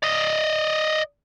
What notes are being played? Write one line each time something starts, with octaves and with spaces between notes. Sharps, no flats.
D5 D#5